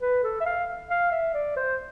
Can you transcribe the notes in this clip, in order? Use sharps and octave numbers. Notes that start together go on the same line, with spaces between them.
B4
A4
E5
F5
F5
E5
D5
C5